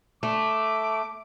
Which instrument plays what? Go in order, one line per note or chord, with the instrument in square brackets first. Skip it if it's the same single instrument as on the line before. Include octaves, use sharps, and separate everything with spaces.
[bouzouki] A3 [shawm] D6